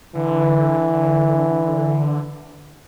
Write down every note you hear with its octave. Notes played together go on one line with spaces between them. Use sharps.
D3 E3